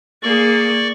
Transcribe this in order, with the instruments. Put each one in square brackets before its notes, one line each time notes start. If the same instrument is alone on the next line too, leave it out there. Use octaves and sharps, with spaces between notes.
[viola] A#3 G#4 [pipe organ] D5 C#6